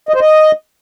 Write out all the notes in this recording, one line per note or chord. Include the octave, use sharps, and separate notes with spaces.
D#5
C5
D#5